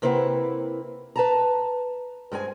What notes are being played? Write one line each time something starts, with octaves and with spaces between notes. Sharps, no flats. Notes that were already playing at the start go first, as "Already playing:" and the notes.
C3 A#3 C4 E4 B4 F#5
B4 A5 A#5
G2 G#3 C4 G#5